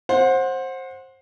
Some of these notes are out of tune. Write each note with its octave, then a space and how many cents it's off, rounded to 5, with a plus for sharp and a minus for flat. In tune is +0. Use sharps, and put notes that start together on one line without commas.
C5 +20 F#5 -20